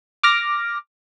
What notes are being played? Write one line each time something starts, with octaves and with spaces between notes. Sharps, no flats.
D6 F6 A#6